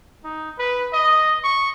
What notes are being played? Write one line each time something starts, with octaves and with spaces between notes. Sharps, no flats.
D#4
B4
D#5
C#6